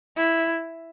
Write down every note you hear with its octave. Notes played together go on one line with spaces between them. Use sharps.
E4